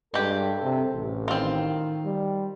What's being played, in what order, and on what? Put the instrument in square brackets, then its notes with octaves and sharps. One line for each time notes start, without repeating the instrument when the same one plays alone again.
[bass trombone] G2 [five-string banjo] G#3 G4 [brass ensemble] A4
[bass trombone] C3
A1
[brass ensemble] D#3 [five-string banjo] C4 F4
[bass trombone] G3